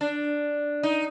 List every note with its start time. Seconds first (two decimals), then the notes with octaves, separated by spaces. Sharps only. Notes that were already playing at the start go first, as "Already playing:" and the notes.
0.01 D4
0.83 D#4